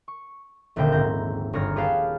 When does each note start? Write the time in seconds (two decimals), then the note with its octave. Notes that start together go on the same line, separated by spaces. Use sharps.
0.08 C#6
0.76 D#1 A#1 A#2 D3 E5 G5
0.92 G#2 C4 A#5 G6
1.53 G1 C#5 A#5 F6
1.76 G4 G#4 B4 F5 G5 A5